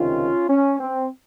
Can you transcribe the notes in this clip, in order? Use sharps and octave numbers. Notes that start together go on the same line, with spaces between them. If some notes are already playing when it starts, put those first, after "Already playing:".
Already playing: C#2 C3 D#3 C#4 F4
C#4
C4